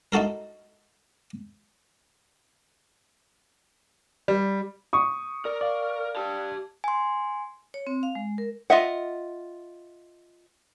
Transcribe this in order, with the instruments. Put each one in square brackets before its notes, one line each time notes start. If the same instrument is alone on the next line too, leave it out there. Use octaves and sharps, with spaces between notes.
[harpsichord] D#4 E4 F#4 A4 A#4
[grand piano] G3
[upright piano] C#6 D#6
[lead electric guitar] A#4 [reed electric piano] D5
[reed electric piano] D5 F5
[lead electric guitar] G4 A5
[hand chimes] G#5 C6
[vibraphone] C#5
C4
F5
G#3
A#4
[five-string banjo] F4 D#5 E5 F#5